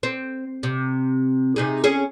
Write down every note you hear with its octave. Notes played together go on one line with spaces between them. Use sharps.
C4
C3
C3 D#4 G#4
C#4 G#4